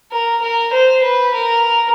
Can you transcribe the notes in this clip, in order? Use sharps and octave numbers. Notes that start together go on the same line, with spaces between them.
A#4
A#4
C5
B4
A#4